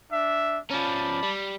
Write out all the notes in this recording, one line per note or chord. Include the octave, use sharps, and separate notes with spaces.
D4 E5
F3 C#4 D5 A5 B5
G3